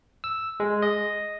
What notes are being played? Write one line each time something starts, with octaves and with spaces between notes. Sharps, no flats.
E6
G#3
D#5